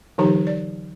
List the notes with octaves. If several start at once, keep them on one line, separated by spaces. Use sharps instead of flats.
D3 E3 F#3 D#4 G4 A#5
D5